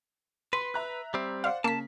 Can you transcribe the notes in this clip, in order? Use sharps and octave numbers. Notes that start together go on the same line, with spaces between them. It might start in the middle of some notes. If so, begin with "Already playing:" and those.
B4 C6
E5 A#5 F#6
G3 C4
C5 D5 F5 F#5
C#3 A#3 A5 B6